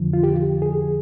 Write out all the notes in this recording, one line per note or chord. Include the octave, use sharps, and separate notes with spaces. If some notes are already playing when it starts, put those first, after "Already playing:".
Already playing: F2 D3 F3
F4
G4
G#4